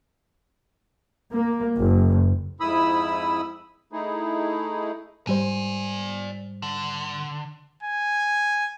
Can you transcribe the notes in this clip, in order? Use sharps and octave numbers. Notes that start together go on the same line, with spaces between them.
A#3
F#1
F2 G#2 E4 B5 D#6 E6
A3 D#4 E4 G#4
G#2 G3 C5 D5 G#5
D3
G#5